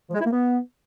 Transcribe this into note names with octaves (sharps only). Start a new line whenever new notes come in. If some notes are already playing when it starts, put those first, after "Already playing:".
F3
G#3
E4
A#3
B3